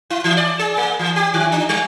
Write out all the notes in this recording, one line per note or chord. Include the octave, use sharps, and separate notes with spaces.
E4
E3
D5
G#4
A#3
E3
G4
D#3
D4
G3